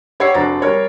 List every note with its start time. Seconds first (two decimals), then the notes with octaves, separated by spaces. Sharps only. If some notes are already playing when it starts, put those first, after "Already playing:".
0.20 G4 C#5 F#5 E6 C7
0.34 F1 D4 F#4 C5 A#5 A6
0.62 G3 A#4 C#5